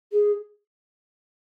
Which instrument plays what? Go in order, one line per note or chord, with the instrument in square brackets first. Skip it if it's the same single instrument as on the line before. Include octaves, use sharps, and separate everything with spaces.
[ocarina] G#4